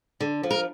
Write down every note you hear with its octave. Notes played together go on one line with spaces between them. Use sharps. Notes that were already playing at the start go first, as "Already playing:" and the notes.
D3
F3
A#4